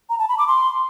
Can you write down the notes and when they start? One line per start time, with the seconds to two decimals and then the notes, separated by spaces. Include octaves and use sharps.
0.10 A#5
0.19 A5
0.29 B5
0.38 D6
0.48 C6